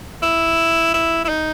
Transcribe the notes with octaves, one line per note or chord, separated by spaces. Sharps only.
E4
E4
E4
D#4